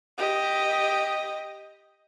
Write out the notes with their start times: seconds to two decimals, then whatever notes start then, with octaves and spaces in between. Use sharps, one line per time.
0.18 G4 D#5